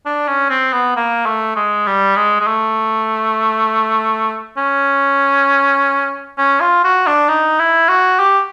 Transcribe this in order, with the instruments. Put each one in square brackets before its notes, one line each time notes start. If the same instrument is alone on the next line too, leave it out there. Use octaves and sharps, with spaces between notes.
[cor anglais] D4
C#4
C4
B3
A#3
A3
G#3
G3
G#3
G#3
A3
C#4
C#4
F4
F#4
D4
D#4
E4
F#4
G4